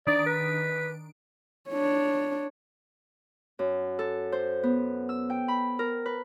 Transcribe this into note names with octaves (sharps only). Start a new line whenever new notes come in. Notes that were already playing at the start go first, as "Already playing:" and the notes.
D#3 D4 D5 D7
B4
D4 C#5
F#2
A4
C5
B3
E6
G5
B5
A#4
B4